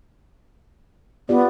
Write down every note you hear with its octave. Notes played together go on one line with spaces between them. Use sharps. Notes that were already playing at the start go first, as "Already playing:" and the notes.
B3 F4 G4 D5